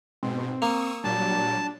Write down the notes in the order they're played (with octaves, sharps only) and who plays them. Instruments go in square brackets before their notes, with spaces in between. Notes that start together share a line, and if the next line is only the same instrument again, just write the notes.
[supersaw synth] G#2 B2 [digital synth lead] C4
[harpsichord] A#3 [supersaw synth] C#6 D#6 E6
[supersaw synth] A#2 F#3 G3 [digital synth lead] D4 [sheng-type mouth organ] A5